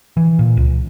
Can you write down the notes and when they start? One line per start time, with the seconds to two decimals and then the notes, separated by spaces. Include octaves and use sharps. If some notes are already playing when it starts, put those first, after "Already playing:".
0.17 E3
0.39 A#2
0.57 C#2